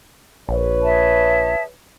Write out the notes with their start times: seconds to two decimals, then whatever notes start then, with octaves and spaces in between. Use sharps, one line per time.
0.49 A#1 B4 C#5
0.83 G#4 E5 A5